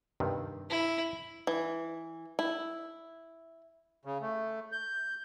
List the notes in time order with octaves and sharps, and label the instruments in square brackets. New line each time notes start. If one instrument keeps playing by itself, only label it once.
[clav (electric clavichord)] G2 C3 D#3
[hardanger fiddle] E4
[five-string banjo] E3
E4
[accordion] C#3
A3
G6